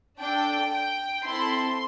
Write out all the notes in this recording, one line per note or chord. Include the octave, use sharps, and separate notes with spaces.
D4 A4 G5
G5
C4 E4 A4 C6